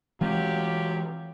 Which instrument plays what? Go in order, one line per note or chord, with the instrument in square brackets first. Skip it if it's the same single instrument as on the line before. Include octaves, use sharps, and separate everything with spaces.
[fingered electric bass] E3 G#3 C4 [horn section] F#3 F4 G4